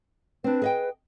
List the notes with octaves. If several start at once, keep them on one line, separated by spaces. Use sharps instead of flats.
C4 D4 B4
G#4 D#5 G5